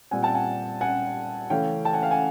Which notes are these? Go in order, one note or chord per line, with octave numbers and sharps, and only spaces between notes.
A#2 G3 C4 F#5 G#5
G5 A5
F#5 G#5
F#5 G#5
C#3 E3 A3 C#4 F5 G5
G5 A5
F#5 G#5
F5 G5
F#5 G#5